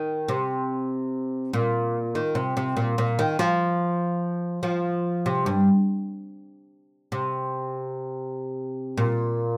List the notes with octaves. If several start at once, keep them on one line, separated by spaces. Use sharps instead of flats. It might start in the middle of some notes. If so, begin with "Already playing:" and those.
Already playing: D#3
C3
A#2
D#3
C3
C3
A#2
A#2
D#3
F3
F3
C3
G2
C3
A#2